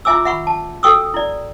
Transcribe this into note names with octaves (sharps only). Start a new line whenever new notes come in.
E4 F4 E5 G#5 D6 E6
E5 F#5 B5 C#6
A5
F#4 A4 G5 C#6 D#6 E6
E4 D5